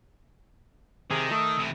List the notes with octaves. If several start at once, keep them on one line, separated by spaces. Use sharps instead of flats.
C3 D#3 G#4
A3 D#6 E6
C3 E3